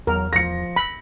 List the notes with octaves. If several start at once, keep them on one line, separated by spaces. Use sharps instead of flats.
E2 F#3 A#4
F3 A#6 C#7
B5